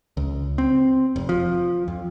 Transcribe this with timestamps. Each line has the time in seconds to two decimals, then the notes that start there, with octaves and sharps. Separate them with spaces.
0.17 C#2
0.58 C4
1.16 F1
1.29 F3
1.88 F2